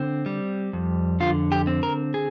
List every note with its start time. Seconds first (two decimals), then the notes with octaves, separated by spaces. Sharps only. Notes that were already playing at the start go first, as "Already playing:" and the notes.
Already playing: D3 C4
0.26 G3
0.73 F2
1.20 D3 F4
1.52 G4
1.67 C4
1.83 A#4
2.14 G#4